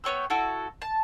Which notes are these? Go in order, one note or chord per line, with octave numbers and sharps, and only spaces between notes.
B3 C#5 G5 E6
E4 F#4 A4
A5